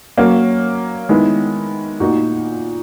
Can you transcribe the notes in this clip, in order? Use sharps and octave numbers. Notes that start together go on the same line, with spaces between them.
F#3 A#3 C#4
D#3 G#3 B3 E4
A#2 A#3 D#4 F#4